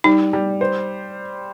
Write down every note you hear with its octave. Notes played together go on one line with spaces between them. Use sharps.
G3 D#4
G3
C5